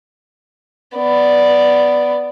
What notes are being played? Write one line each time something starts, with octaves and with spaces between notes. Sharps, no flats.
B3 D5